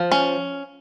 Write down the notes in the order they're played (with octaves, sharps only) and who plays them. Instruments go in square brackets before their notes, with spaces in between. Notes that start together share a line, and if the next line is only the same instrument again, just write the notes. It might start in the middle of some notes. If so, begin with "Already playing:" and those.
Already playing: [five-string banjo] F3
C#4